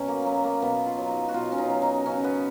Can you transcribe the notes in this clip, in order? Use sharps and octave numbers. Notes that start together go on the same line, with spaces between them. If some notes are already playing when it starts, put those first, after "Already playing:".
Already playing: B2 F#3 C#4
A#3
F#3 B3
A#3
B2 B3
F4
F#3
D#4
F#4
B2 F4
C#4
D#4
F#3
D#4
C#3 C#4
B3